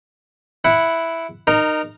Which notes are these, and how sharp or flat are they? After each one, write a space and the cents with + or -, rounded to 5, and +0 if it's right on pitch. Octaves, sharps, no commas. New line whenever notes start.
E4 +0 F#5 +0
D#4 -20 A#4 +0